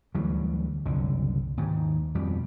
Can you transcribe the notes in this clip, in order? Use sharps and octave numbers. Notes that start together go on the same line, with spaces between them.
D2 E3 F#3 G3
F#1 C2 D3
D#2 G#2
F2 B2 G3